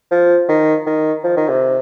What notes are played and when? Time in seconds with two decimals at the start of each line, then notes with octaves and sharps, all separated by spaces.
0.11 F3
0.48 D#3
0.86 D#3
1.24 F3
1.37 D#3
1.48 C3